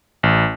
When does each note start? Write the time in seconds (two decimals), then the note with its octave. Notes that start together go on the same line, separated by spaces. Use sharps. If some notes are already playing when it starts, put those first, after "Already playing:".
0.23 A1